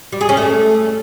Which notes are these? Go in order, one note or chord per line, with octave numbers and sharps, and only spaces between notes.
G3
G#4
C#4
A3